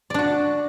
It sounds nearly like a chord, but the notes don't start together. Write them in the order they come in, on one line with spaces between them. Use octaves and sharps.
D5 D4 F#4